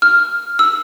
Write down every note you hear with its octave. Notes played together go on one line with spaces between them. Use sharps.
F6
E6